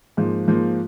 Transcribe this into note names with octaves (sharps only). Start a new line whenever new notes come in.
G#2 F3 A#3
G#2 F3 A#3